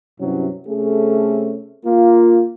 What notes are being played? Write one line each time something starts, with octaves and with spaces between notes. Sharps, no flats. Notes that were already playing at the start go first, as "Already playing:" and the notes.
G2 C3 F#3 C#4 E4
C3 A3 C#4 G#4 A4
A#3 F4